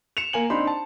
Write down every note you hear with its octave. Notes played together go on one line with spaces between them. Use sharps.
C#7 E7 F7
A#3 G#5 F#7
C4 D4 D#4 C5 B5 C6
A5